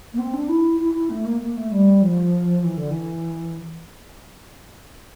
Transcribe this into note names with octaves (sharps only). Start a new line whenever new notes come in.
A#3
C4
D4
E4
E4
E4
A3
A#3
A#3
A3
G3
F3
E3
D3
E3